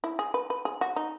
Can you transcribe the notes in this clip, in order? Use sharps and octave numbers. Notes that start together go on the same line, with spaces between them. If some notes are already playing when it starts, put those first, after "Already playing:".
E4
G#4
B4
B4
G#4
F#4
D#4